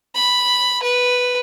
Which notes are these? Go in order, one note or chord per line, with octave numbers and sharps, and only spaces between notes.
B5
B4